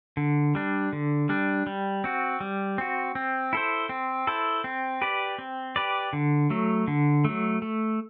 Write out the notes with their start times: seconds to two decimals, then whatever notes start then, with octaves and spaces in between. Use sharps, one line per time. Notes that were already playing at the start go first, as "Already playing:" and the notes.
0.17 D3
0.55 G3 D4
0.93 D3
1.29 G3 D4
1.67 G3
2.04 C4 F#4
2.41 G3
2.78 C4 F#4
3.15 C4
3.53 E4 A4 C5
3.89 C4
4.27 E4 A4 C5
4.64 C4
5.02 G4 B4 D5
5.39 C4
5.76 G4 B4 D5
6.13 D3
6.50 F#3 A3
6.87 D3
7.25 F#3 A3
7.62 A3